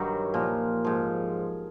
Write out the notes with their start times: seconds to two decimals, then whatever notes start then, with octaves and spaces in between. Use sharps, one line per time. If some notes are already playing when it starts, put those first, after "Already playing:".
Already playing: G2 D#3 F#3
0.34 A#2 F3
0.85 G#2 F3